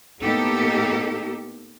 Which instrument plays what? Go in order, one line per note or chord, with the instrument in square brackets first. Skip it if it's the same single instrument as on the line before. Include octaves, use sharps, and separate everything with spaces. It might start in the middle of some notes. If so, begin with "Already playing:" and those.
[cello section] A2 A#3 B3 D#4 G4 A4